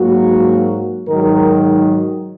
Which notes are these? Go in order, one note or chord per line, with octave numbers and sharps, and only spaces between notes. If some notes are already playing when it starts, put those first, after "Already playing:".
Already playing: G#2 F#3 A#3 F#4
G#2 D#3 F#3 A#4